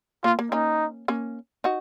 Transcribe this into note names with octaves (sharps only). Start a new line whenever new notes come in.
A#3 F4
A#3
A#3 C#4 D#4
A#3 C#4
D#4 F#4